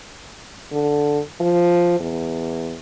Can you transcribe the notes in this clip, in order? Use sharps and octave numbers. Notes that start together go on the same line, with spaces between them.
D3
F3
E2